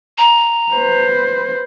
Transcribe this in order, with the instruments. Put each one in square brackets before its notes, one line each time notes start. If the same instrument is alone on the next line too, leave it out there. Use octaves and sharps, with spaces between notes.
[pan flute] A#5
[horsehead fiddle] B4 C5